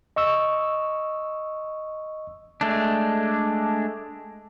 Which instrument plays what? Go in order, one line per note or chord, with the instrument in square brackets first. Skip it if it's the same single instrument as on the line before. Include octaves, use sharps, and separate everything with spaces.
[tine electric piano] D#5 C#6 E6
[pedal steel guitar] G#3 A3 D4